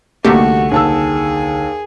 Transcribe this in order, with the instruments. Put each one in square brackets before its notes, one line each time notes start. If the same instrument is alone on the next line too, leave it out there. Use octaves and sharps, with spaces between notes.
[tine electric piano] C2 D3 [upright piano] A3 [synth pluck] A#3 D#4 G4 [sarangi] F#4
[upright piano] D#2 A5 E6 [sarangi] G#4